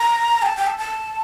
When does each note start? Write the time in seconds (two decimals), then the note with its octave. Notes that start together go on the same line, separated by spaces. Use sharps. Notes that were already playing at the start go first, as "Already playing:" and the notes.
Already playing: A#5
0.42 G5
0.46 A5
0.57 G5
0.67 A5
0.78 A5